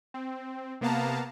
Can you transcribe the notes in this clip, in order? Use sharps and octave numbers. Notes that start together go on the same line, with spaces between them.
C4
C3 A#3 B3 F5 A5 A#5